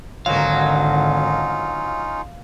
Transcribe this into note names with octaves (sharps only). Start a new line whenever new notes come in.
G#1 D3 F#3 A#3 C#4 D#4 F4 F5